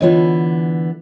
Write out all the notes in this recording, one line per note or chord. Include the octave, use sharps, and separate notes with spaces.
D3 E3 B3 F4 C#5 D#5